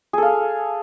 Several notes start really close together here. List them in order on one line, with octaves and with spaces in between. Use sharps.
G#4 A4 F5